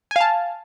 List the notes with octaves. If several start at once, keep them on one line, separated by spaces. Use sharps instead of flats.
F5 G#5 A5